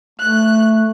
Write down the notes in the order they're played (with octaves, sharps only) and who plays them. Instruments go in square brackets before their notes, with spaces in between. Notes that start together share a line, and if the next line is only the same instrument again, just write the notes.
[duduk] A3 [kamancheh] F#6